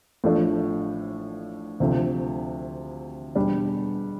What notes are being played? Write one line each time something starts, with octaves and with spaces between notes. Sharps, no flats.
A1 A2 F3 A3 D4
D2 C3 F3 A3
E2 B2 G3 D4